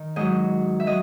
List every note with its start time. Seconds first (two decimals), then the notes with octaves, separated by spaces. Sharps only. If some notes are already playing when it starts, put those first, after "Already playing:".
Already playing: D#3
0.16 G#2 F#3 D#5
0.80 E5
0.86 F#3 D#5